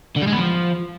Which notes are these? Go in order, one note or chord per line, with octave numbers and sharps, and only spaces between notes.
D3
G3
G#3
B3
F3